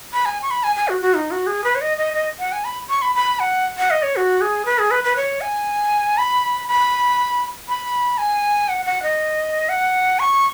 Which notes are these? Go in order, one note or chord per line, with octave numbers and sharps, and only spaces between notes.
B5
G#5
C#6
B5
G#5
G#5
F#4
F#4
D#4
F#4
G#4
B4
C#5
D#5
D#5
D#5
F#5
G#5
B5
C#6
B5
B5
F#5
F#5
D#5
C#5
F#4
G#4
B4
G#4
B4
B4
C#5
G#5
B5
B5
B5
G#5
F#5
F#5
D#5
F#5
C#6